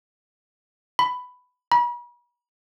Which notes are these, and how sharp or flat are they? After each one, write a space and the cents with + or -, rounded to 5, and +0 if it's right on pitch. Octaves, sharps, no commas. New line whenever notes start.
B5 +10
B5 -40